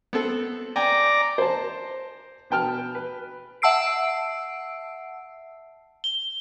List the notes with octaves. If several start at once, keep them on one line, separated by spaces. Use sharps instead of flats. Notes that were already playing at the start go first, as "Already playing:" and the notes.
B3 C4 A4
D5 G5 G#5 A#5
C5 A5
B2 B4 G5 A5 F6
B4
E5 F#5 A5 E6 C7 D7
G7